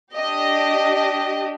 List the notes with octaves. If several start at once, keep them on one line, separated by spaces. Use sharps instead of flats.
D4 G4 D#5
D#5